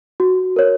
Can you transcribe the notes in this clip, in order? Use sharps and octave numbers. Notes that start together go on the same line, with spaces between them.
F#4
A#4 C#5